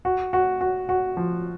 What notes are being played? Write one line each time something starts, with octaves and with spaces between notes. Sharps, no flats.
F#4
F#4
F#4
F#4
F3